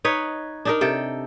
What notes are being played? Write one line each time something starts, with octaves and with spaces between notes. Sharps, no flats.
D#4 B4 C#5
D4 D#4 A#4
C3 A4 G5